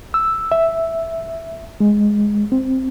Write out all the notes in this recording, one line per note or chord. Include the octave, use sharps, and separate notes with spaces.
E6
E5
G#3
C4